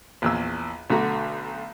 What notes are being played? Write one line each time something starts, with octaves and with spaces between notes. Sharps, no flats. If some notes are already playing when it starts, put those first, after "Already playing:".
A#1 E2 E6
B1 D3 A3 F#4 A#5